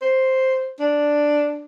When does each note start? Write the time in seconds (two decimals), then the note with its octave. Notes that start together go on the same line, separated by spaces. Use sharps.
0.02 C5
0.80 D4